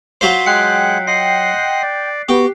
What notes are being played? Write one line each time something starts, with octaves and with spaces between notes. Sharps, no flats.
F#3 F4 C5 B6 C7
G#3 F#5 G5 F#6 C#7
D#5 F#5 C6 C7
D5
B3 F#4 G4